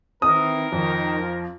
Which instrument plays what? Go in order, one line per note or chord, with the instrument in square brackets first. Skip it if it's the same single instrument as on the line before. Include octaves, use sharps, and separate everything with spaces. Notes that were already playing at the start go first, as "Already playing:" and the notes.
[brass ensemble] D#3 E3 C4 [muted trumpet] A#4 [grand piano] D#6
[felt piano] F2 [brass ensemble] D#3
[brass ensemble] F3